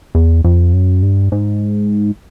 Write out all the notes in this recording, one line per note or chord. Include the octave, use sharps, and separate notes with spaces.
E2
F2
F#2
G2
G#2